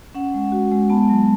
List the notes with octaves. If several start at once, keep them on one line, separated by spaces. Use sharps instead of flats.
C#4 F#5
G#3
F#4
G#3
B3 A5
F#3